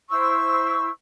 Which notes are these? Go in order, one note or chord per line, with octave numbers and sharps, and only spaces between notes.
E4 C5 C#6 E6